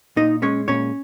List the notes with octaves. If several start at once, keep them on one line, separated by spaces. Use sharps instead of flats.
A#2 D#4 D#5
G#3 C#4 C#5
A#2 C#4 C#5